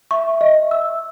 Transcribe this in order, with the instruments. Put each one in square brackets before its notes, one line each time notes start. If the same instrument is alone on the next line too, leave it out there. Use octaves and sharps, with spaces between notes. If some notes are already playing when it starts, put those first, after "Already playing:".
[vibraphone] E5 [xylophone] C#6
[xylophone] D#5
E6